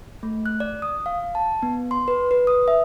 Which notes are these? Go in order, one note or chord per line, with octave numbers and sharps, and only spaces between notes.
A3
F#6
D5
D#6
F5
A5
B3
C6
B4
B4
D#6
E5